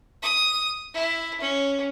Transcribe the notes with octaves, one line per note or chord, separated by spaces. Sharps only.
D#6
E4
C#4